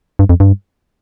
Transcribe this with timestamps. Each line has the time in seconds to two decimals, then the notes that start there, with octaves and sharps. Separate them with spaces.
0.19 G2
0.29 F2
0.40 G2